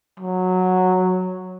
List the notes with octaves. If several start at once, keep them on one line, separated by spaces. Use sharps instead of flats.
F#3